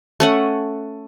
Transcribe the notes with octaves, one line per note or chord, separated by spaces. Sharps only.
A3 C#4 F#5